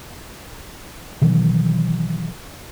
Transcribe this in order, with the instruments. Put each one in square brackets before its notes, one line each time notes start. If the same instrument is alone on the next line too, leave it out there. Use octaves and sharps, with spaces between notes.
[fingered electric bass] B2 D#3 E3 F#3